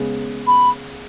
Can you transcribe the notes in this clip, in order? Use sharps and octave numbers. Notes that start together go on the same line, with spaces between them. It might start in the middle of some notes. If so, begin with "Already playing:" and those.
Already playing: C#3 G#3 B3
B5